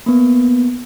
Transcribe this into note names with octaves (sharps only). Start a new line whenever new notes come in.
A#3 B3